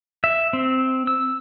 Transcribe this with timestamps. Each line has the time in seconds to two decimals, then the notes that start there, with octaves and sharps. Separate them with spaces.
0.24 E5
0.53 C4
1.07 E6